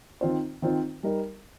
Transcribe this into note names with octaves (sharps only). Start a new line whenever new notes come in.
D#3 C4 F4 C5
D#3 C4 F4 C5
G3 D#4 A#4